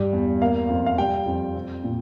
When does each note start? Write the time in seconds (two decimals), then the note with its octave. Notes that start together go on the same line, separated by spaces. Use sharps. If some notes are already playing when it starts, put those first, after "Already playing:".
Already playing: G2 G3
0.13 E2
0.41 A#3 F5
0.69 F2
0.86 F5
0.98 G3 G5
1.26 F2
1.55 C4
1.84 A#2